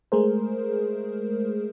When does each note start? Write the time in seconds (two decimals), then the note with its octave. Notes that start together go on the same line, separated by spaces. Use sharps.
0.12 G#3 A3 G#4 A#4 C5